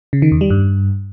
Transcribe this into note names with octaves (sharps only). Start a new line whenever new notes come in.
C#3
D#3
E2
G3
G2